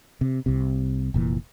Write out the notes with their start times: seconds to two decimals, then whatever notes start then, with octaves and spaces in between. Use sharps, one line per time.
0.21 C3
0.46 C2 C3
1.14 F1 A#2 E3